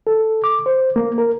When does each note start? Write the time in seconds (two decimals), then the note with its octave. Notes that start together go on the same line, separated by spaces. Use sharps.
0.07 A4
0.44 D6
0.66 C5
0.96 A#3
1.18 A#4